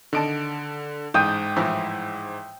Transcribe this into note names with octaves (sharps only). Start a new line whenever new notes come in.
D3 D#3 D#5 A5 D7
A1 G#2 G5 D#6
A2 E3 F3